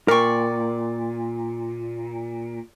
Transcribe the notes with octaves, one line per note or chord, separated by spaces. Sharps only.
A#2 A#4 D5 G5 C#6